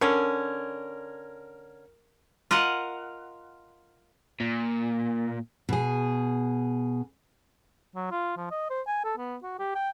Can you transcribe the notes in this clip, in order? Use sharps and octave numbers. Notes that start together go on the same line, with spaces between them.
D3 C#4 A#4
F4 A#4 D#5 F#5
A#2
B2 G#4
F#3
F4
F3
D#5
C5
G#5
A4
B3
F#4
G4
G5